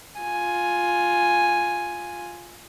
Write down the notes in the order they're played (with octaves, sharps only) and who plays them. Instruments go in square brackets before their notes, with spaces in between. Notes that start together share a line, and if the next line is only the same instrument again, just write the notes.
[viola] F4 G#5